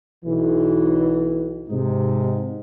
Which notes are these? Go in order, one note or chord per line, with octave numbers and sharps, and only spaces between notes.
B1 E3
G#2 C3 D#4